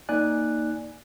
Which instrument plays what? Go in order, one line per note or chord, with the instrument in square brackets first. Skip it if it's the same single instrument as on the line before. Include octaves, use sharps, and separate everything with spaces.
[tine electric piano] A#3 D#4 D5 G#5 F#6